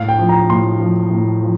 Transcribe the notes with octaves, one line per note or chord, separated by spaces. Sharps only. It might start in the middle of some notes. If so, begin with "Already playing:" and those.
Already playing: A2 F5
G5
F3
A#5
A2 C6
F3
A2
F3